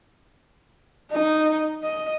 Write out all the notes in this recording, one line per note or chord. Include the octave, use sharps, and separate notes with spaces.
D#4
D#5